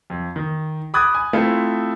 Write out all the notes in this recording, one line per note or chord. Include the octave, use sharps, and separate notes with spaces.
F2
D#3
B5 D6 D#6 F#6 G#6 A6
G#5
A3 C4 E4 F4